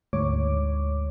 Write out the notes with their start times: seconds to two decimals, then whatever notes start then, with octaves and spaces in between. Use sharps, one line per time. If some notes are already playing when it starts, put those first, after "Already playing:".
0.13 D2 G#2 C#5 D6